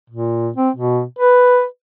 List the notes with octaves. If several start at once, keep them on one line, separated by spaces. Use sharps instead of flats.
A#2
C4
B2
B4